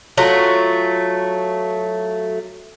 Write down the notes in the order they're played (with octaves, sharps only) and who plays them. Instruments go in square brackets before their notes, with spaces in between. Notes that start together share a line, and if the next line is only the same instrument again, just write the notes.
[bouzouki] F#3 A3 F4